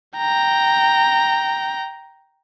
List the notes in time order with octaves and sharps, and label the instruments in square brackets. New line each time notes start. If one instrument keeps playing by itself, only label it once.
[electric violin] G5 A#5